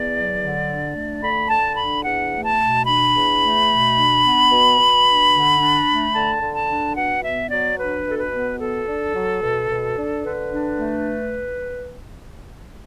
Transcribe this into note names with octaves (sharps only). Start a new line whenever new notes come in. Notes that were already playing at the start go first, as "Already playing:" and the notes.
Already playing: E2 B3 D5
F#3
D3
D4
A3
D3 B5
D3 A5
D4 B5
E2 F#5
A3
A5
B2
D4 B5
E2
A3
B2
D4
B3
B2
B2
D4
D3
D4
A3
D3 A5
D3
A5
D4
B2 F#5
B3 E5
F#3 D5
D4 B4
B2 A4
B4
B3
B2 A4
D4
F#3
B2
B2
D4
D3 B4
D4
A3